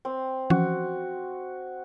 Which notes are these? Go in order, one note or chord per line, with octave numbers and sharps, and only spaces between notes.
C4
E3 F3 C#4 F#4